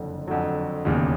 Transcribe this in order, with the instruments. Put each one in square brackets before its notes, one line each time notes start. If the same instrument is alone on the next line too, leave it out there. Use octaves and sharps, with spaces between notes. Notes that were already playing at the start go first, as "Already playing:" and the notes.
Already playing: [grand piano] F#1 F2 D3
F2 D3 F#3
E1 D#2 C#3